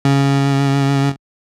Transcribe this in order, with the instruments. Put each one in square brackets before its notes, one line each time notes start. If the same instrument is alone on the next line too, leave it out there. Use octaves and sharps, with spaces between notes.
[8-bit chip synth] C#3